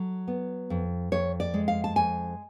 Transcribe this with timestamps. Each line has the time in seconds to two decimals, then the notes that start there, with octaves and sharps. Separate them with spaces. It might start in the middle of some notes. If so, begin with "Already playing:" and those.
Already playing: F#3 A4
0.28 B3
0.70 F2
1.12 F2 C#5
1.40 D5
1.54 G#3
1.68 F5
1.84 A5
1.96 F2 G#5